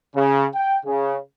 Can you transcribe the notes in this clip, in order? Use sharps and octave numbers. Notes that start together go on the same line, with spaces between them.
C#3
G5
C#3